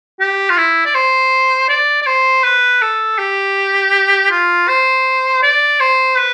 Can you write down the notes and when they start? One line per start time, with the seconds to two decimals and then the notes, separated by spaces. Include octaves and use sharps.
0.20 G4
0.50 F4
0.57 E4
0.86 D5
0.95 C5
1.69 D5
2.02 D5
2.07 C5
2.44 B4
2.82 A4
3.19 G4
4.31 F4
4.68 C5
5.43 D5
5.80 C5
6.18 B4